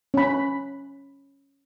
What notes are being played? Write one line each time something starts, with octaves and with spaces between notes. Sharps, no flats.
C#4 B5